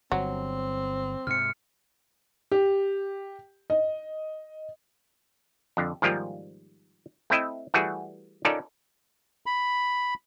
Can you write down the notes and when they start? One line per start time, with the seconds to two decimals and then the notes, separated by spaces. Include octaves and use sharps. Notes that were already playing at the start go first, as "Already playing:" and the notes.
0.12 G1 F#3 C4
1.27 G#2 C3 F6 C#7
2.52 G4
3.70 D#5
5.77 F2 D3
6.02 G#2 D#3 F3 G3 A#3 F4
7.30 A3 C4 E4 D#5 E5
7.74 E3 G3 A3 F#4 G#4
8.45 C#4 D#4 F4 A4 A#4 D5
9.46 B5